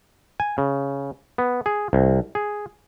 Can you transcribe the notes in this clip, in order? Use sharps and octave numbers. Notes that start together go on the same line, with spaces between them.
G#5
C#3
B3
G#4
C2
G#4